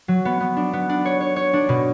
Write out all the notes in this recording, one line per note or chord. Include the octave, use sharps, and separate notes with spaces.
F#3
B3
B3
D4
B3
D4
C#5
C#5
C#5
D4
B2